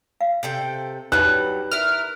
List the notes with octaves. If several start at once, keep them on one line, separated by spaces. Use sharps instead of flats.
F5
C3 A4 G5
F#3 G3 D#4 B4 F#6
E4 A#4 F6